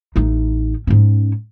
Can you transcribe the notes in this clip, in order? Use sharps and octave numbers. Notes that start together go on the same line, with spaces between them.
A1 D#4
G#2 C#4